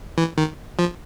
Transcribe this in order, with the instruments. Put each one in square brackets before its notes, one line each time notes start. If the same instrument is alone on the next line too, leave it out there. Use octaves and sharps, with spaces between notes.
[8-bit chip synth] E3
D#3
F3